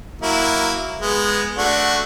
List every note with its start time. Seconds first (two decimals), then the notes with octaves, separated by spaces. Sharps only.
0.22 F#3 A#3 E4
1.01 G#3 B3
1.58 A3 D4 F#4